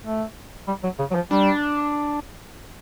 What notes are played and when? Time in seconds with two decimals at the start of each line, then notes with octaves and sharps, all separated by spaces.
0.04 A3
0.68 G3
0.83 F#3
0.99 C#3
1.11 F#3
1.15 F3
1.31 G3 D4